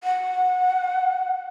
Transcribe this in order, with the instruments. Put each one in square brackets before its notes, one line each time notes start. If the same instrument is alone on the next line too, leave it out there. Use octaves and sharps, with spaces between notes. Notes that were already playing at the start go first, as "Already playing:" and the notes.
[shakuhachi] F#5